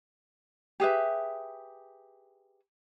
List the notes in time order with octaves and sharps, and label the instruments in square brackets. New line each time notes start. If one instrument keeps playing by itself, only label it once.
[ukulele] G4 G#4 B4 E5